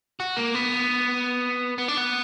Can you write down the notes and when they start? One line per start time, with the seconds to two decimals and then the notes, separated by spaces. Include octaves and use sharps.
0.20 F#4
0.37 A#3
0.55 B3
1.78 B3
1.88 D4
1.97 B3